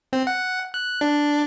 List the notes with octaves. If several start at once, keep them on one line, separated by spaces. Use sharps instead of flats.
C4
F#5
F#6
D4